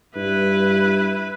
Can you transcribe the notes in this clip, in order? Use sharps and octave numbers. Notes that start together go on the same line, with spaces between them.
G2 E4 B4